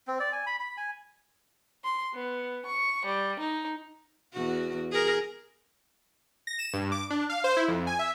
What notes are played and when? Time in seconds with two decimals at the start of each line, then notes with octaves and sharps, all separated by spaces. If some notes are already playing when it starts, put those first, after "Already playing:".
0.07 C4
0.20 D5
0.33 G#5
0.46 B5
0.60 B5
0.77 G#5
1.84 C6
2.14 B3
2.65 C#6
3.06 G3
3.39 D#4
4.33 E2 F#4
4.91 G#4 A#4
6.47 A#6
6.59 E7
6.73 G2
6.92 D6
7.10 D4
7.29 F5
7.44 C5
7.57 E4
7.68 F2
7.87 G#5
7.99 E5